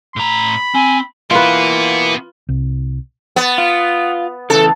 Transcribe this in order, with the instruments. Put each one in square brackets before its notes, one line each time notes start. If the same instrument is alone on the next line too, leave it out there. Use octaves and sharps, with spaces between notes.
[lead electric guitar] A2 A#5 [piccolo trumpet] B5
[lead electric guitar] C4 [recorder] G#5
[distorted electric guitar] B2 B3 [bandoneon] E3 A#3 [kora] F4 B4
[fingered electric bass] C2
[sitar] B3
[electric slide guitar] F4
[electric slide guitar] C#3 E3 [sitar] A4